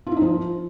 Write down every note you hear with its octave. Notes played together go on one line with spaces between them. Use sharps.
F4
E4
D#4
F3